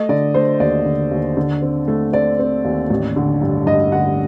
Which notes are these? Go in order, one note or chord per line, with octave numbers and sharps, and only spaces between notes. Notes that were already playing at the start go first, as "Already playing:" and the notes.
Already playing: A3 D#5
D3 D5
A3 C5
D#2 D5
D3
D#2
D3
C4
A3
C4 D5
C4
D#2
A1
D3
G2
G2 D#5
D3 F#5